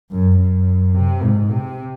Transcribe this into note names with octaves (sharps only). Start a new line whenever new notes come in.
F#2
F#2
C3
G#2
C3